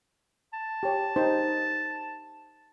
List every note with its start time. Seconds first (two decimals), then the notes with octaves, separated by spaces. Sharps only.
0.54 A5
0.83 G4 C#5
1.16 D#4 G4 C5